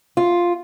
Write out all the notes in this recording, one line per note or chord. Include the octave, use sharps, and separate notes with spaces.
F4